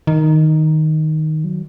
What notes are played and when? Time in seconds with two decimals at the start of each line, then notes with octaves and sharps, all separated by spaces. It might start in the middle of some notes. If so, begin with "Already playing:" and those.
0.07 D#3
1.44 F#3